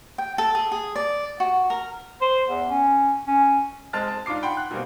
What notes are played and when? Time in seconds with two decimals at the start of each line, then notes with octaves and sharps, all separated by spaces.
0.18 G5
0.38 A4
0.55 G#4
0.72 G#4
0.96 D5
1.40 F#4
1.70 A#4
2.21 C5
2.48 E2
2.70 C#4
3.27 C#4
3.93 G#3 C4 A5 F6 A6
4.08 A5
4.26 G#2 D4 F4 D6 C7
4.43 F#5 G5 B5 C6
4.57 F#6
4.71 B2 G3 A#3 C4